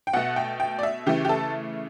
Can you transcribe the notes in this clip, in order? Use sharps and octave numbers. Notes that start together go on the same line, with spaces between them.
G5
B2 A3 F#5
G5
G5
D5
E5
C#3 E3 A3 G4
G4
A4